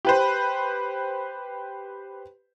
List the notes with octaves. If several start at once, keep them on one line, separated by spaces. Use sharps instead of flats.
G4 B4 C5